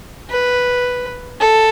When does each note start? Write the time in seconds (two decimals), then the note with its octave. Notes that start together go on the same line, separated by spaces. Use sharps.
0.30 B4
1.40 A4